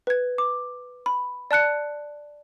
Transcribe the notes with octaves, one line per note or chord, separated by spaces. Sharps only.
B4 G#6
D6
B5
D5 A5 F#6 C#7